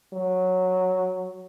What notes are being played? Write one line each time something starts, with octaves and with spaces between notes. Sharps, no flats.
F#3